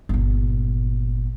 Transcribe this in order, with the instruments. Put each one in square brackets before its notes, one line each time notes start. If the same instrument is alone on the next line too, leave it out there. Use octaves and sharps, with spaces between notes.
[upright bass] G1 A#2